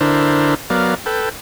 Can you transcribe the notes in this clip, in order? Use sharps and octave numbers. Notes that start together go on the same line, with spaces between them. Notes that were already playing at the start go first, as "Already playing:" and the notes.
D3 D4 E4 A#4 C5
F#3 B3 A#4 D5 F5
A4 B4 G5